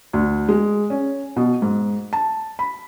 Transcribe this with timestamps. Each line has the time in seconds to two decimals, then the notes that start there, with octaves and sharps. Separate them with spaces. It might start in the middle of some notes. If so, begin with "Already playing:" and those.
0.13 D2
0.49 G#3
0.90 C#4
1.36 B2
1.62 G#2
2.13 A5
2.59 B5